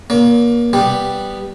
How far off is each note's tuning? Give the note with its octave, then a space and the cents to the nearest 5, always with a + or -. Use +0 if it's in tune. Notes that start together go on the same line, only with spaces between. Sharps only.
A#3 +30 C#5 +45
G3 +0 B3 +0 G4 +0